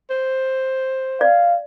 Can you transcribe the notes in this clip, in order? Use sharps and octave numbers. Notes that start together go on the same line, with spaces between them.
C5
D5 F5